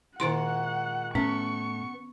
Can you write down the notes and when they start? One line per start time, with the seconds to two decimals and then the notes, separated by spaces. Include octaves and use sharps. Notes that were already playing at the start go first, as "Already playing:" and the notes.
0.20 A#2 D#3 G#3 E4 F#4 F#5 C6
1.15 A2 B3 C#4 C#6